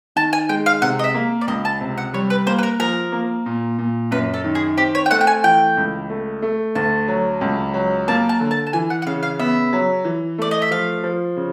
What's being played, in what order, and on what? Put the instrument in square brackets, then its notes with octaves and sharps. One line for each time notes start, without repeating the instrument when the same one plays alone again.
[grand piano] D#3 [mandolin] A5
[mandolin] G#5
[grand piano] G#3 [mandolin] G5
[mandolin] F5
[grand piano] C3 [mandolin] F#5
[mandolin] D#5
E5
[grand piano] A#3
[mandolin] D5
[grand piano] C#2 [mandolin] D#5
[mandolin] A5
[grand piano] C3
[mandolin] F#5
[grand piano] G3 [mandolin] C#5
[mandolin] B4
[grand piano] A#3 [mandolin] C5
[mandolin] B4
A#4
[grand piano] F3 [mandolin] A#4
[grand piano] A#3
A#2
A#2
[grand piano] F#2 [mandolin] B4
[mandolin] A4
[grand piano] D#3
[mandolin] G#4
[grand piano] C4 [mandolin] G4
[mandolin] C#5
G5
[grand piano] A3 [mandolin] F#5
[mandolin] G5
G#5
[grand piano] E3 [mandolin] G5
[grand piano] C#2
A3
A3
[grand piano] D2 [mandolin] A5
[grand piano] F#3
C#2
F#3
[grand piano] A#3 [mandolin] A5
[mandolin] A5
[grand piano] D3
[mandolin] A5
A5
[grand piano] E3 [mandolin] G#5
[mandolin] F#5
F#5
[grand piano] C#3 [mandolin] F5
[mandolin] F5
[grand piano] B3 [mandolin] E5
[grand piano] F#3
E3
[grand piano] A3 [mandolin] D5
[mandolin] D#5
E5
[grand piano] F3 [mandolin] F5
[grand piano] F3
C#3